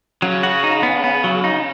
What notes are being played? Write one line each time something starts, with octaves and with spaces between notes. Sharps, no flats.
C#3 F#3
F#4
D#4
B3
B3
F#3
D#4